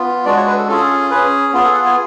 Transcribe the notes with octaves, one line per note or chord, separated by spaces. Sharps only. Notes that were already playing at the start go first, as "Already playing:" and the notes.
Already playing: B3 F4
G#3 D4 F#4 D5
C#5
B4
A4
C#4 F4 G#4 A4
C#4 G#4 B4
B3 F4 G#4
A4
F#5
G#5